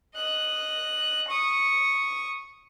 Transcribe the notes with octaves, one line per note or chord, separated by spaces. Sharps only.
D#5 F#6
C#6 D#6